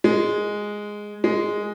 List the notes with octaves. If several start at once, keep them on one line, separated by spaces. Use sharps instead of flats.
G#3
G#3